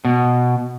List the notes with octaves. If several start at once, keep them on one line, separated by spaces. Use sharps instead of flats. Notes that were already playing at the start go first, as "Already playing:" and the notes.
B2